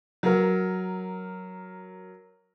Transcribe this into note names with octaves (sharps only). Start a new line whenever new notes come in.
F#3 A#4